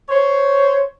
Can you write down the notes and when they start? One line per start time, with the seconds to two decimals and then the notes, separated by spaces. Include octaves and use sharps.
0.09 C5 C#5